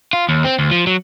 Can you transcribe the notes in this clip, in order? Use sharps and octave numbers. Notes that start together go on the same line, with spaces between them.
F4
D#2
C4
D2
F3
F#3